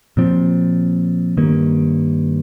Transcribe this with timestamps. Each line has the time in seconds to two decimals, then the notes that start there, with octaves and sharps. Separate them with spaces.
0.17 A#2 F3 C4
1.37 G2 D#3 A#3